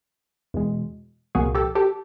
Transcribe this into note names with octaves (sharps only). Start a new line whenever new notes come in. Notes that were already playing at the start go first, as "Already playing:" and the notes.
E2 B2 G#3
C2 A#2 F3 A#3 F#4 G#4
G4 A4
G4 A4